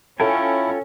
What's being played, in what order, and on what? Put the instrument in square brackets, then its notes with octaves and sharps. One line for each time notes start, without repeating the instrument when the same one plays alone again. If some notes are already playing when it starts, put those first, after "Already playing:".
[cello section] C#4 [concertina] E4 [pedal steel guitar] F4 G5 G#5 [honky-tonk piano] A4